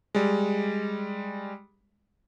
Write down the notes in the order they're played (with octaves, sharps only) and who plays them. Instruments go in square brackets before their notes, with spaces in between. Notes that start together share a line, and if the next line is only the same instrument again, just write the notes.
[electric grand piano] G3 G#3